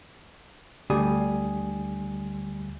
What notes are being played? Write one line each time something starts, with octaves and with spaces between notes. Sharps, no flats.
D2 D3 G3 G4 G#5 D#6